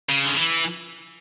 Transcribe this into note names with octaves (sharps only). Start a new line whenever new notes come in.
C#3
D3
E3